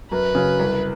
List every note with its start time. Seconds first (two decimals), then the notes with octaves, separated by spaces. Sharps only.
0.11 F#2 B4
0.35 C#3 F#3
0.59 C2